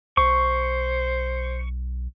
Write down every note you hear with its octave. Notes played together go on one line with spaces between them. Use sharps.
B1 C5 C#6